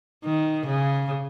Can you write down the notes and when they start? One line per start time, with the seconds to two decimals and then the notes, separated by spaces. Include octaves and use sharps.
0.25 D#3
0.67 C#3